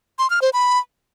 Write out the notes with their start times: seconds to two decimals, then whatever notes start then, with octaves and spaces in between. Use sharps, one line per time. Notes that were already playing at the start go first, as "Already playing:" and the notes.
0.19 C6
0.30 F6
0.42 C5
0.53 B5